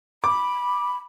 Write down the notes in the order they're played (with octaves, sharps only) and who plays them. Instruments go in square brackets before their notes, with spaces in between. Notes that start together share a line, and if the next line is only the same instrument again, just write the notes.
[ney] B5 [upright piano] D6